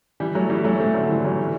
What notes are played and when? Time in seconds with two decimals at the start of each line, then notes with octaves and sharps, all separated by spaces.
0.20 E3 G3
0.35 F#3 A3
0.50 E3 G3
0.64 F#3 A3
0.80 A3 C4
0.94 D3 F#3
1.09 E3 G3
1.24 F#3 A3
1.39 E3 G3